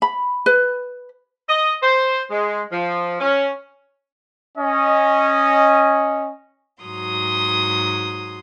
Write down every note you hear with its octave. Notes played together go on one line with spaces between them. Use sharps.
B5
B4
D#5
C5
G#3
F3
C#4
C#4 D#5
G#2 F#3 C6 D#6